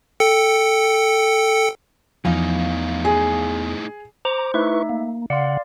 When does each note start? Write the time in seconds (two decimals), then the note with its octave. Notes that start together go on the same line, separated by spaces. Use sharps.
0.20 A4 G5 C#7
2.25 E2 A2 F3 D#4 F5 G#5
3.05 G#4
4.25 C5 A#5 D6
4.54 A3 D#4 E4 B4 E5 C#6
4.89 A#3
5.30 C#3 D5 F5 F#5 C6